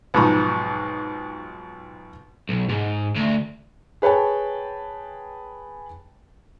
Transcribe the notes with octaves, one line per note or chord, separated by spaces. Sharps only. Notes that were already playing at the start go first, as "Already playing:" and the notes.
B1 G#2 F3 A#5 B5 C#6
B1
G#2
D2
G#4 B4 C#5 G5 A5